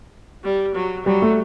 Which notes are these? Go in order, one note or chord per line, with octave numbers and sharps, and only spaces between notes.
G3
F#3
F#3 G3
A3